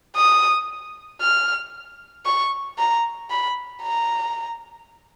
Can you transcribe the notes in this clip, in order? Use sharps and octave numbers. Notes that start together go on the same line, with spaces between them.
D#6
F6
C#6
A#5
B5
A#5